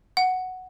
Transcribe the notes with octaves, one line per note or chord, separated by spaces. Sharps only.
F#5